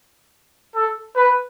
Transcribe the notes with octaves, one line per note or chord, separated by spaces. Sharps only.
A4
B4